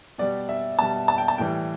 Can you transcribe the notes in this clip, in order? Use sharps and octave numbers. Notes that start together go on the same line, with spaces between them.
B2 G3 D5
E5
B2 G3 A5
A5
G5
A5
A2 E3 G3 G5